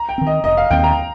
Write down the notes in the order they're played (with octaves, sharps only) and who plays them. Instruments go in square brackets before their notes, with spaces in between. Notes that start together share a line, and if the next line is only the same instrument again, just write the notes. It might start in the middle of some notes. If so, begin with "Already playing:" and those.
Already playing: [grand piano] A#5
G5
[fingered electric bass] D#3 C4
[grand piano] D#5
[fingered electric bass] F1 [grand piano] D#5
[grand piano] F5
[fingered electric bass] D#2 D#3 C4 [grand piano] G5
[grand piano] A#5